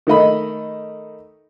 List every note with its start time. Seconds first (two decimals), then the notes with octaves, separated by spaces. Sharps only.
0.07 D#3 A3 D#5 B5